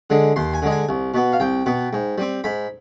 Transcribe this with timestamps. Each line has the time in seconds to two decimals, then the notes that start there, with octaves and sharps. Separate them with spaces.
0.10 D3 G#3
0.36 D#2 C6
0.53 G#5
0.62 D3 G#3
0.71 G#5
0.89 C2
1.14 B2 B3
1.32 F5
1.40 C2 G5
1.66 B2 B3
1.93 G#2
2.18 G3 C4
2.44 G#2 B5